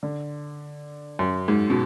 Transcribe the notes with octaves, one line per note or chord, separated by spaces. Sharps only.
D3
F#2
G#2
B2